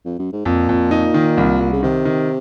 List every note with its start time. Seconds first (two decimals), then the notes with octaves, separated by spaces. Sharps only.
0.05 F2
0.19 F#2
0.32 G#2
0.45 F2 A#2
0.69 F2
0.91 D#4
1.14 D#3
1.37 C2
1.60 C2
1.72 C#3
1.83 C3 D#3
2.05 D#3